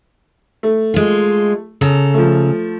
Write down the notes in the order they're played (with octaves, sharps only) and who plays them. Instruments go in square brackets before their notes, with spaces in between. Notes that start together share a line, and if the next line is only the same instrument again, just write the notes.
[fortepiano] A3
[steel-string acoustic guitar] G#3 F4
C#3 A4 A#5
[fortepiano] F3 A3